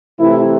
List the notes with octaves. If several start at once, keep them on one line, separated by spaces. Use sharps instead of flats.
C3 E3 A3 E4